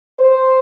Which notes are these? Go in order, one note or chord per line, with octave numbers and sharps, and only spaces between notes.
C5